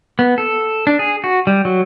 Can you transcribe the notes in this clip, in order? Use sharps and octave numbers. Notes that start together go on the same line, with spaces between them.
B3
A4
D4
G#4
F#4
G3
F#3